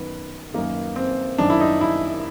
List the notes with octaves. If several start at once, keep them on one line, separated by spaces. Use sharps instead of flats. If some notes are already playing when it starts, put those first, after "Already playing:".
Already playing: F#2 D#3 B3
F#2 D#3 A#3
C4
F#2 D#3 D4
E4
D#4
E4